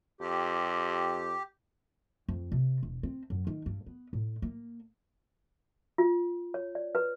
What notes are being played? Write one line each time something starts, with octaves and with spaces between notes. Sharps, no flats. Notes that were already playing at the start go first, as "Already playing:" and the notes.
F2 G4
F2
C3
E1
C4
F#2
D#3
G2
B3
A2
A#3
F4
C#5
D5
B4